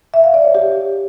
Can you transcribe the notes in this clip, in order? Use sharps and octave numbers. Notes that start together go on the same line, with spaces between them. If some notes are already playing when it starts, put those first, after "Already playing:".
E5
F5
D5
C#5
G4